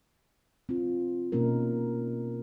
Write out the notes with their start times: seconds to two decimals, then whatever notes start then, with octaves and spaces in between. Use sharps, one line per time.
0.69 C4 F4
1.32 B2 A#3 C#4 D#4 A#4